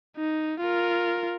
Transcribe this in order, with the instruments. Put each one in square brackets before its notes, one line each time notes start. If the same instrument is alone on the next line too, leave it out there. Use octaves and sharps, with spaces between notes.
[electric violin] D#4
F4 A#4